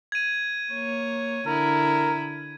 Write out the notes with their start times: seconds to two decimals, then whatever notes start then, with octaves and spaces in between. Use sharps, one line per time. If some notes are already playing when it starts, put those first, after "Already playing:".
0.12 G#6 D#7
0.71 A#3 C#5
1.47 D3 E4 A#4